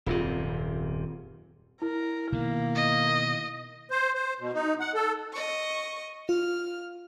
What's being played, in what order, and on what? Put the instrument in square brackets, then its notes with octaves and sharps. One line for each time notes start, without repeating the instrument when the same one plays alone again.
[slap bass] D#1 F#2 C3 [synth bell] C4 F4 G#4
[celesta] E4 [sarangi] A#4
[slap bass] B2 D#3 [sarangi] A#3
[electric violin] D#5
[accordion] C5
C5
B2
D#4
F#5
A4
[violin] D#5 C#6
[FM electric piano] F4 [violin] F6